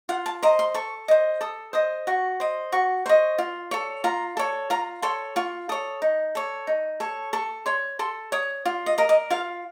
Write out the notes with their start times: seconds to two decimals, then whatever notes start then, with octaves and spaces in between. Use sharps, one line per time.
0.09 F4 F#5
0.26 A5
0.43 C5 D#5 A#5
0.59 C6
0.74 A4 C#6
1.08 C5 D#5
1.41 A4 D#6
1.73 C5 D#5 D#6
2.07 F#4 C#6
2.40 C5 D#5
2.72 F#4 C#6
3.06 C5 D#5 C#6
3.38 F4
3.71 A4 C#5
4.04 F4 A#5
4.37 A4 C#5
4.70 F4 A#5
5.02 A4 C#5 C6
5.36 F4 C#6
5.69 A4 C#5 D#6
6.02 D#4
6.35 A4 C#5
6.67 D#4
7.00 A4 C#5
7.33 A4 C#6
7.66 C#5 C6
7.99 A4 C6
8.32 C#5 D#6
8.66 F4
8.86 D#5
8.98 A#4 D#5
9.09 D#5
9.30 F4 F5